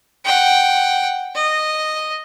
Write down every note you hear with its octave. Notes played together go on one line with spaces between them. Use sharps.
F#5 G5
D#5